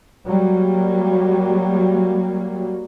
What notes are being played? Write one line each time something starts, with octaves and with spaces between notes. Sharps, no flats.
F#3 G3 A#3